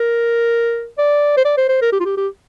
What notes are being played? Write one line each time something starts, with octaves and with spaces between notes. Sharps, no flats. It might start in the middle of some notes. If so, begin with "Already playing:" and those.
Already playing: A#4
D5
C5
D5
C5
C5
A#4
G4
F4
G4
G4